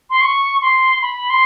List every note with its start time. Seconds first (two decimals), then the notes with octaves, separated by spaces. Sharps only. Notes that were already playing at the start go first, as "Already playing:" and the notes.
0.10 C6
0.21 C#6
0.62 C6
1.02 B5
1.30 C6